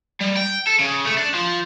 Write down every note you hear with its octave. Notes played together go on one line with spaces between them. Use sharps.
G3
G5
A4
C#3
A3
D4
F3